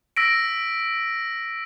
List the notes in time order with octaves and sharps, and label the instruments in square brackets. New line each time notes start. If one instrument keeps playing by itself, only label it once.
[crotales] E6 A#6 B6 D7